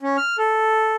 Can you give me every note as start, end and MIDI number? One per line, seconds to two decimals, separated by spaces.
0.01 0.17 61
0.17 0.37 89
0.38 0.96 69